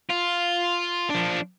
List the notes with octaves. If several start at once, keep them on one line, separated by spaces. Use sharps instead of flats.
F4
F3 D4